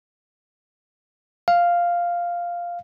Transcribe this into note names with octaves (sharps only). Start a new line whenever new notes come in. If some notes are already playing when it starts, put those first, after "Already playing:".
F5